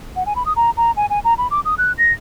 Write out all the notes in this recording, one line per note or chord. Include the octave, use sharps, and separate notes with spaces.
F#5
G#5
B5
D#6
A#5
A#5
G#5
G#5
A#5
B5
D6
D#6
F#6
A#6